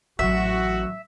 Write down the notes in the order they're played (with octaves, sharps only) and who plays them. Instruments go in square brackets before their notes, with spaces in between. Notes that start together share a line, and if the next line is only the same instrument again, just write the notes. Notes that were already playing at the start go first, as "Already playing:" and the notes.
[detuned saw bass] A1 [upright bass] E3 F#3 [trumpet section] F#4 [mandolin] E5